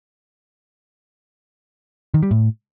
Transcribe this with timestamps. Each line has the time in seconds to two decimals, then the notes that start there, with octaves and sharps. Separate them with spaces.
2.14 D#3
2.23 G3
2.31 A2